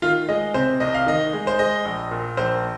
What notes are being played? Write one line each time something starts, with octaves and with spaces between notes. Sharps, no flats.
D#3 F4 F5
G#3 D#5
C3 C5
C2 D#5
F5
D#3 D#5
G#3
C5
G#3 D#5
A#1
A#2
A#1 C5